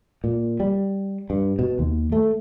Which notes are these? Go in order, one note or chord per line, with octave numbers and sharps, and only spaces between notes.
A#2
G3
G2
B2
D#2
A3